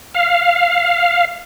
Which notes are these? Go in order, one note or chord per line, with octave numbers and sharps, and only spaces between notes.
F5